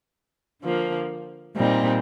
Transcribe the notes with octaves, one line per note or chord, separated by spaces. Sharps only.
D3 F3 A#3
A#2 G3 C4 D#4